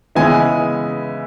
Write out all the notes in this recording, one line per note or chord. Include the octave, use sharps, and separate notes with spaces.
C#3 E3 G#3 B3 E4 G#5